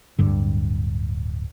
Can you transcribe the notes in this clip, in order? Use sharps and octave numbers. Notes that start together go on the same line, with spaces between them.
D1 G2 D3